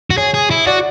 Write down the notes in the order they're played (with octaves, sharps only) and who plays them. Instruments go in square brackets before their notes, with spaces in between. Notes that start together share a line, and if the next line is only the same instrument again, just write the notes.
[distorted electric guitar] F#4
[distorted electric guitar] G#4 [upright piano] C#5
[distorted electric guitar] G#4
E4
[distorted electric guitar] F#4 [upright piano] D5